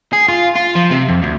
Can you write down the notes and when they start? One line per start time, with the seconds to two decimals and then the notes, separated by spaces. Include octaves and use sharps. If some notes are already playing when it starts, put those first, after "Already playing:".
0.13 G#4
0.28 F4
0.56 F4
0.76 F3
0.91 C3
1.09 F2
1.23 D2